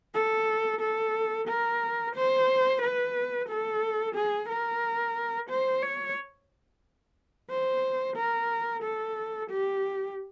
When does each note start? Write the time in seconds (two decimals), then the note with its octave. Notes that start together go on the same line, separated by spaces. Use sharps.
0.14 A4
0.81 A4
1.48 A#4
2.15 C5
2.82 B4
3.49 A4
4.15 G#4
4.49 A#4
5.49 C5
5.82 C#5
7.50 C5
8.17 A#4
8.83 A4
9.50 G4